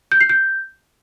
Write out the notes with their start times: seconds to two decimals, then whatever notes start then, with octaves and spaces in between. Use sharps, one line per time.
0.12 G6
0.21 C7
0.29 G6